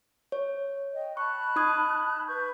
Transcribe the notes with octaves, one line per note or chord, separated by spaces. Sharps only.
C#5
D#5 G5
A5 B5 C#6 F#6
D#4 D#6 G#6
B4 C#6 G6